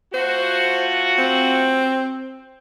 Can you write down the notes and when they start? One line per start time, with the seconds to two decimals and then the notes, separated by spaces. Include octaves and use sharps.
0.14 A3 F4 F#4 C5
1.18 C4